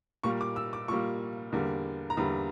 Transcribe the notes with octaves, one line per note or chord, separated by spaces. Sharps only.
A#2 G3 A#3 C#6
D6
E6
D6
A#2 G3 A#3 C#6
E2 D3 G3 A#3
A#5
E2 D3 G3 A#3 B5